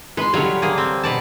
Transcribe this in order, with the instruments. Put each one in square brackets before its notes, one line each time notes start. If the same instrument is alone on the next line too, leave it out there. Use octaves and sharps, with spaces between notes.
[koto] G#3 [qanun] B4 C6
[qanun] D3 G3 [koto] F#3 C#5 F5
[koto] A#3 G#4
C4
B2 D5 A5